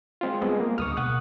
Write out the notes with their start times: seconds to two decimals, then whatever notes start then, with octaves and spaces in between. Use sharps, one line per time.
0.21 G#3 C4 F4
0.42 G3 G#3 B3
0.60 A#3
0.78 D2 C#6 D#6 F6
0.97 B2 F#5 D#6 F#6